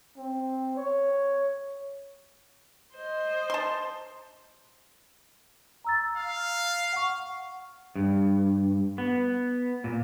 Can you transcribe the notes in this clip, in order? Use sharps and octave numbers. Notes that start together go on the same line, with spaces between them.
C4
C#5
C5 D#5
A5 C6
A#5 E6 A6
F5
F#5 C#6
G2
B3
A#2